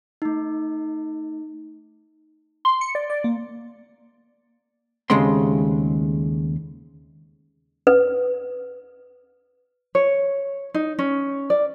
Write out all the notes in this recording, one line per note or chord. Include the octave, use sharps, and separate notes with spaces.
A3 D#4
C6
C#7
D5
D5
A#3
D#2 C#3 G#3 A3 C4 C6
B4
C#5
D#4
C#4
D5